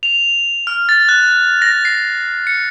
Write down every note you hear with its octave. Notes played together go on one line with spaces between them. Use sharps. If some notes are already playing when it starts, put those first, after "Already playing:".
F7
F6
A6
F#6
A#6
C7
C#7